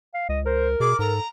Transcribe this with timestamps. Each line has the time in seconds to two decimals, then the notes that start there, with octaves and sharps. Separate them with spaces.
0.14 F5
0.29 C#2 D#5
0.46 A#4 C5
0.80 B2 G#4 D6
0.99 G#2 A4 A#5